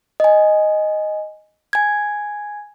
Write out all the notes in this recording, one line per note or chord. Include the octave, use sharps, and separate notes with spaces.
D#5 G#5
G#5 G#6